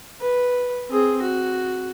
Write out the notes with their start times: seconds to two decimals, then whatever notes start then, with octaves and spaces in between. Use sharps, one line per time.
0.20 B4
0.90 C4 G#4
1.22 F#4